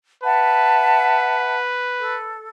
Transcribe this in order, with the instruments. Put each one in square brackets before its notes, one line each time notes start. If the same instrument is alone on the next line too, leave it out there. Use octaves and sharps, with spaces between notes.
[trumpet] B4 [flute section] E5 F#5 A5
[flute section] A4